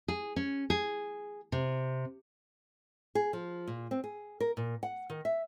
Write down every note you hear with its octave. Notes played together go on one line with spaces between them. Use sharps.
G#4
C#4
G#4
C3
G#4
F3
A#2
C4
G#4
A#4
A#2
F#5
D#3
E5